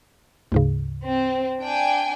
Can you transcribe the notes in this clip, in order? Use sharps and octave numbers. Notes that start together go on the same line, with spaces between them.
D2 G#2 C#3
C4
D4 G5 G#5